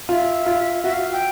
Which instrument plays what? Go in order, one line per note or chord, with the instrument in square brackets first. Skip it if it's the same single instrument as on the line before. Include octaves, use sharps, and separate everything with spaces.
[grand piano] F4 [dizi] E5 F5
[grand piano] F4
[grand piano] F#4 [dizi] E5
[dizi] F5
G5